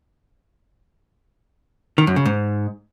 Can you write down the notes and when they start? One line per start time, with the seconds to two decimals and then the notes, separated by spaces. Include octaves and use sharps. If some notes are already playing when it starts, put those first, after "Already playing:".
1.98 D#3
2.07 F#2
2.16 C#3
2.26 G#2